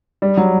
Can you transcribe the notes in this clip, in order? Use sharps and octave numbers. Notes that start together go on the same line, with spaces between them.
G3
F#3